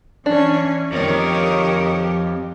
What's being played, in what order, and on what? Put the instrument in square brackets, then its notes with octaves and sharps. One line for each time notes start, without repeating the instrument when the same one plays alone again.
[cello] E3 C#4 [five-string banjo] D4
[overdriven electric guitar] F2 [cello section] D#3 A#4 C#5 [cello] G4